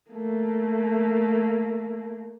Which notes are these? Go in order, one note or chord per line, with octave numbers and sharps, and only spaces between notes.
A3 A#3